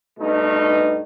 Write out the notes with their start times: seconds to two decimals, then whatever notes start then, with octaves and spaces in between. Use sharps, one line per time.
0.18 G2 B2 A3 D#4